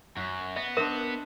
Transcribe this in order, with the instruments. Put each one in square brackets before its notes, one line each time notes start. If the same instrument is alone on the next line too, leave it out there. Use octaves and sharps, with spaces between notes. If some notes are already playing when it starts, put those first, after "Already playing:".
[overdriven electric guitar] F#2 [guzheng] F#4
[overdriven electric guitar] B3 [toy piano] E5
[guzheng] D4 C5 D#5 [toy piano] A#4 E5